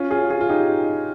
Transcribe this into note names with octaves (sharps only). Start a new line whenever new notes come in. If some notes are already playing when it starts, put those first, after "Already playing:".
Already playing: C#4 F4
F4 G#4
F4 G#4
F4
D#4 G4